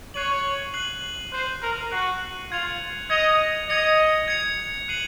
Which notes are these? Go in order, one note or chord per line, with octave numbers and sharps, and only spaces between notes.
C#5 F#6 C7 D#7 F#7
F#6 C7 D#7 F#7
C5 F#6 C7 D#7 F#7
A#4
F#4 F#6 C7 D#7 F#7
F4 G#6 C#7 F7
D#5 G#6 C#7 F7
D#5 G#6 C#7 F7
G#6 C#7 F7
F#6 C7 D#7 F#7